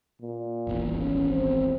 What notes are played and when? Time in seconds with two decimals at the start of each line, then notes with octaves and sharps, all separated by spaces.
0.22 A#2
0.67 D#1 G#1 E2
0.96 C#4
1.29 C4